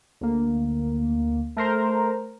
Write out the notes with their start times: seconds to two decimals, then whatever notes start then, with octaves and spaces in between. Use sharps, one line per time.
0.21 D2 A#3
1.56 A3 A#4 C5 A#5